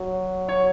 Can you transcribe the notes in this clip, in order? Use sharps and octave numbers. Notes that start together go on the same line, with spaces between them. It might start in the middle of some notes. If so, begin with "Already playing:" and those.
Already playing: F#3
C#5